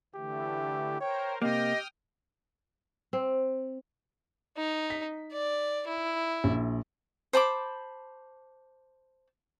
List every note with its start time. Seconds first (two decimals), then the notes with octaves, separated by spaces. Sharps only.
0.15 D3 E3 A3 G4
1.00 A#4 C5 C#5 G5
1.42 C3 A#3 G4 D#5 G5 D#6 F6
3.13 C4
4.57 D#4
4.90 B6
5.32 D5
5.87 E4
6.44 A#1
7.33 C5 A5 B5 D6